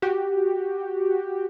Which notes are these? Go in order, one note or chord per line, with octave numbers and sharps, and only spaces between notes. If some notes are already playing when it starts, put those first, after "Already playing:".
F#4 G4